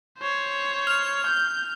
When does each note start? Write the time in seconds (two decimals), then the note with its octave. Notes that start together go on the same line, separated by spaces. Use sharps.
0.18 C5 C#5
0.87 F6 F7
1.26 G6